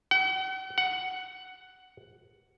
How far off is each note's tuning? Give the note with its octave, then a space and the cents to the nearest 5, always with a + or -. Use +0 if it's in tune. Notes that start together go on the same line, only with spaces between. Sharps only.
F#5 +45
F#5 +10